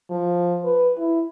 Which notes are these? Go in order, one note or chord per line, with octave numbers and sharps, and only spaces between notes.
F3
B4
E4